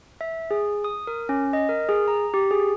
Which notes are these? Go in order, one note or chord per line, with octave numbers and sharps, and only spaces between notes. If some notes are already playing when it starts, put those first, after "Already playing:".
E5
G#4
D#6
A#4
C#4
D#5
A#4
G#4
A#5
G4
G#4